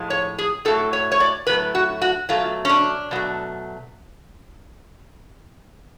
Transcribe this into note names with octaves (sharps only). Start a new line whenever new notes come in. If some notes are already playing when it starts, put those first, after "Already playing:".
Already playing: A2 F3 G#3
C#5
G#4
A2 F#3 A3 A4
C#5
C#5
D5
A2 F#3 A3 B4
F#4
F#4
B2 F#3 A3 F4
C#4
D4
B2 F#3 A3